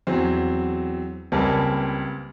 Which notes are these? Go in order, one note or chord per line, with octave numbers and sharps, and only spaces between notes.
E2 F#3 C4
C#2 G3 A#3 C4 B4 A5